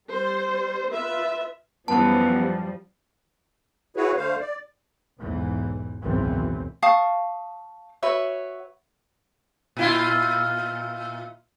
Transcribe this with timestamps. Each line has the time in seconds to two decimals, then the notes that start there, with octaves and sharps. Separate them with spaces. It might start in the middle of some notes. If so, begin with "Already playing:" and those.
0.10 G3 C5
0.91 F4 B4 E5
1.88 F#2 E3 F3 G3 B3 A5
3.96 E4 F#4 G#4 B4 C#5
4.17 D3 A3 C5 F5
4.40 D5
5.19 B1 E2 G#2 E3
6.01 G#1 C#2 F#2 B2 E3 C4
6.82 F5 A5 C#6 D#6
8.03 F#4 B4 C#5 E5
9.77 A#2 E4 F4